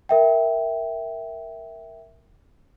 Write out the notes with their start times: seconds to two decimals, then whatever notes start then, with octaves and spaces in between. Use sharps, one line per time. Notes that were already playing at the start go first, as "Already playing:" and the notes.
0.09 A#4 E5 G5